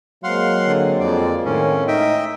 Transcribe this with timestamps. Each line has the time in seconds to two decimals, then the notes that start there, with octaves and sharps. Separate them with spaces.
0.24 F#3 G#3 A#3 C4 F5 F#5 C6
0.67 D3
1.00 F2 D5
1.45 A2 D#3 C#4
1.88 D#4 D#5 E5 G5